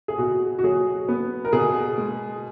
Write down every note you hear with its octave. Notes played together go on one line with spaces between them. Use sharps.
G#4
B2 F#4
F#4
F#3 G#4
B3
A#4
B2 G#4
G#3